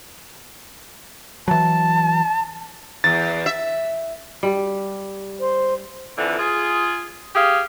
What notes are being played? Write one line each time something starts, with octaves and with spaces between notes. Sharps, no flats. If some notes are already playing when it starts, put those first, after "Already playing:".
E3 F#3 A5
E2 A6
E5
G3
C5
F2 D3 E3
F4 G#4
G4 G#4 F5